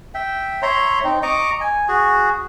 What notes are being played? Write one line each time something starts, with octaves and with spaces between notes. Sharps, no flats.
E5 G5
C#5 E5 A#5 C6
C4 D#4
D#5 A#5 C#6 D6
G#5
F#4 G#4